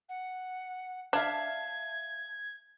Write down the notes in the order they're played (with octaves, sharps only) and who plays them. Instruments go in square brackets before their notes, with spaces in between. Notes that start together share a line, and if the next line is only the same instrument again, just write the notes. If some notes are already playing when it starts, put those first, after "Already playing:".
[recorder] F#5
[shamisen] D4 [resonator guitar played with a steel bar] E5 F5 A5 [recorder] G#6